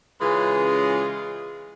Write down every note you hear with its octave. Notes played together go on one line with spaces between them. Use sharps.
C#3 E3 G#3 C#4 F4 G#4